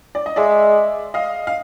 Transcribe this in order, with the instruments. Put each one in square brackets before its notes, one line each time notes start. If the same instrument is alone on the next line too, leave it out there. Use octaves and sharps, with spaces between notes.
[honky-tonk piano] D5
D#5
[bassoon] G#3 [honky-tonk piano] D5 E5
[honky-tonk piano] D#5 F5
F5